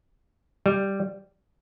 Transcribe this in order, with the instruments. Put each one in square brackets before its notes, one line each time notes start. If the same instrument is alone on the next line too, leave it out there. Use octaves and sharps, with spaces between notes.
[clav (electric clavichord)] G3